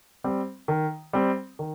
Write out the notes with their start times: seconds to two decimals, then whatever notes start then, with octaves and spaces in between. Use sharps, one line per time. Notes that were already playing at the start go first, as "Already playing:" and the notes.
0.24 G3 C4
0.68 D#3
1.13 G3 C4
1.59 D#3